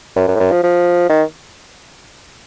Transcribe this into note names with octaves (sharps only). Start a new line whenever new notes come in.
F#2
F#2
A2
F#2
F3
F3
D#3